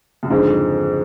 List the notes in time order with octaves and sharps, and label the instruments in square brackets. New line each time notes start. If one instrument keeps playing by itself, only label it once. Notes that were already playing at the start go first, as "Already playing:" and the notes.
[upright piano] F#2
[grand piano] F#1 F2 D3 [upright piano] G#2